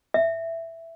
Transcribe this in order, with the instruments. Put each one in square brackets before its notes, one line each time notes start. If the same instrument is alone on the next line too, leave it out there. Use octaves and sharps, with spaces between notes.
[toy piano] E5